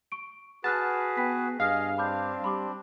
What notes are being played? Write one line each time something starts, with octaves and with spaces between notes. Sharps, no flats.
C#6 D7
F#4 G#4 B4 F#5 A5 F6 F#6
B3 G5 B5 B6
G2 G#4 D#5 F5 F6
C4 D4 B5 D6 G6
G3 B5 C6 D6